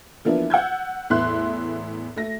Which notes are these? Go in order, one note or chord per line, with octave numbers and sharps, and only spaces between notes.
E3 F3 A#3 B3 D4 E4
F#5 E6 G6 G#6
E2 A2 B3 E5 C6 F#6
A3 A#6